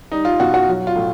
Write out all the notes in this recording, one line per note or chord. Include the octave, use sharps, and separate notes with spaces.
G3 D#4
F4
B2 F#4
F#4
F#3
F4
A2